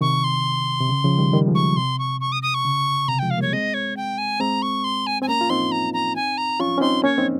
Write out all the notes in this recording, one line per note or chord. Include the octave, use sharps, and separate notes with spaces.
C3 D#3 C#6
C6
C3
C#3
C#3 F3
D#3 G3
D#3 G3
F3 G#3
C#6
C3 C6
C#6
C#6
D#6
D#6
C#6
C#3
C3 A#5
F3 G#3 G5
F5
G3 A#3 C#5
G#3 C4 D#5
C#5
G5
G#5
G#3 C4 A#5
C#6
C6
G#5
C4 G#5
A#3 C#4 A#5
F4
C4 D#4 C6
A#5
A#5
G#5
A#5
C#4 F4 C#6
C#4
C4 D#4 C6
A#3 C#4 C#5
C4 D#4